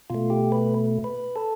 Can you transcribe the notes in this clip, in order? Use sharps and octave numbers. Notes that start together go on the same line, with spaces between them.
B2 A3 F4
G4
B4
B4
A4